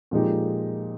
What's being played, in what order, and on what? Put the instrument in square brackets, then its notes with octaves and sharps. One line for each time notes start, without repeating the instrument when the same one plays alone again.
[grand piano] A#2 F3 G#3 D#4 G4